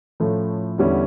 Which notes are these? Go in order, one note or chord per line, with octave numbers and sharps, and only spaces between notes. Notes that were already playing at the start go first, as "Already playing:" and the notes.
A2 F3 A3 C#4 E4
E2 D3 G3 C#4 E4